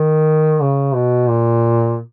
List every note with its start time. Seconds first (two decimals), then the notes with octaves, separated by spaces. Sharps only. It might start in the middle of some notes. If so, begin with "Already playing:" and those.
Already playing: D#3
0.61 C#3
0.94 B2
1.28 A#2